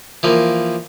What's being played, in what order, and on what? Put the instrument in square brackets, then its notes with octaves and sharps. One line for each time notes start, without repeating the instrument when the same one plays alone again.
[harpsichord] E3 F3 A#3